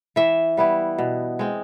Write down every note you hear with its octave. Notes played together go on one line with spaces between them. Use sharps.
E3 E5
G3 B3 E4
B2
G#3 C4